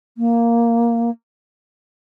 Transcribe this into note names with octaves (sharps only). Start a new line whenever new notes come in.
A#3